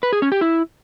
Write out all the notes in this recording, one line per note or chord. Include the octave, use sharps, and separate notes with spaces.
B4
G#4
C#4
G4
E4